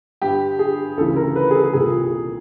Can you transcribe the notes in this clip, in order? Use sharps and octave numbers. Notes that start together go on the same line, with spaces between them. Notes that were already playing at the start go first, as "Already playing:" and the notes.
G2 D3 G4
G#4
D2 C#3 E3 A4
A#4
B4
G#4
A4
C2 A#2 G#4